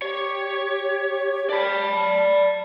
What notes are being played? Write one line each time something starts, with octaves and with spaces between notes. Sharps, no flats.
G4 C#5
D5 A5 B5